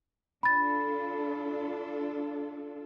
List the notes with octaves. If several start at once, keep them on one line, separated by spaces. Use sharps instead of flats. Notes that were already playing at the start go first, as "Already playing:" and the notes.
D4 F4 A4 B5 A6